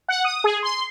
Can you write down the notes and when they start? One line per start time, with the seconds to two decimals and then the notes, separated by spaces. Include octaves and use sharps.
0.08 F#5
0.24 D#6
0.44 G#4
0.63 C6